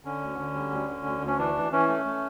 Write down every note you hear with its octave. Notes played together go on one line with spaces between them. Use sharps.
D3 C#4
D2
D3
G3
D2
D3
D2
D2
C#4
E3 D4
E3
E3 C#4
A3
A3